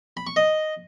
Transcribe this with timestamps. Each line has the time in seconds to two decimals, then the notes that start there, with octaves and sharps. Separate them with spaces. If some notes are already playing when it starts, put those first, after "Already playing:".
0.17 B5
0.27 C#6
0.36 D#5